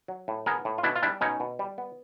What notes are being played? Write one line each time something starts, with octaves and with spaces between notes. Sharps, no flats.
F#3
A2
B3 G#4 A#4
A2
F4
B2 D4 E4
F4
G3 D4 E4
B2 C#4 D#4
B2
G3
B3